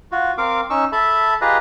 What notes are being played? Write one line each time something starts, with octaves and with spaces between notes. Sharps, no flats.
F4 F#4
C4 A#4 F5 D6
C#4 D#4 C#6 E6
A4 E5 A5 B5
F4 G4 G#4 B4 D#5 A#5